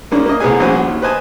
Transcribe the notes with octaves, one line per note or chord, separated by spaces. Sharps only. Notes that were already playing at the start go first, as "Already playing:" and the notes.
G#2 A#3 C#4 D4
A#3 D#5
C2 A3 B3 G#4 G#5
A#1 C#4 F#4 C5 G#5
D#2
B4 C5 D#5 G#5 A5